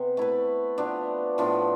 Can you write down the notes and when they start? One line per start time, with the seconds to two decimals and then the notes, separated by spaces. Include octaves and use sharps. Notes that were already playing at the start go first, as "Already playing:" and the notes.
Already playing: C3 B3
0.17 A3 E4 B4
0.78 F3 B3 D4
1.38 A2 F3 B3 D4